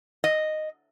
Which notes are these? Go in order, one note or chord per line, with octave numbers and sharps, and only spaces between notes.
D#5